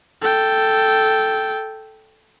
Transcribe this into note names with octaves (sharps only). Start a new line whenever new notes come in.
A4 G5